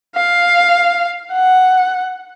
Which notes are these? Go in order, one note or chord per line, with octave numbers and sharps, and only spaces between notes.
F5
F#5